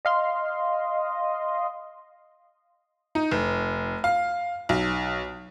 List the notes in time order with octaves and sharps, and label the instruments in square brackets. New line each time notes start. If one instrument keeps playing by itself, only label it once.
[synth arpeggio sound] D#5 F5 C6
[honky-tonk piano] D#4
F1
F5
B1